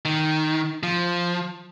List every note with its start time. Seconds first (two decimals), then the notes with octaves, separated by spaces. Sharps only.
0.05 D#3
0.83 F3